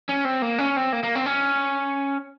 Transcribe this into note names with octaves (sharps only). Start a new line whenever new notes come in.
C#4
C4
A#3
C#4
C4
A#3
A#3
C4
C#4